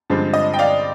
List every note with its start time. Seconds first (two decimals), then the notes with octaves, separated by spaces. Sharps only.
0.10 G2 D3 F3 G#3 C4
0.34 D#5
0.54 G5
0.59 D5 F5